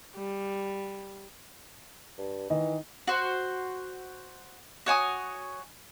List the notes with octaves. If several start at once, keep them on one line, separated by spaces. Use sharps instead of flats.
G3
G2
D#3 E3 D#4 D#5
F#4 C5
F#4 C#5 G#5 D#6